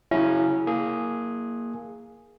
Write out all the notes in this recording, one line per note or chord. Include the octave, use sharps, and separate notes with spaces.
C#3 F#3 C#4 E4
A#3 G#4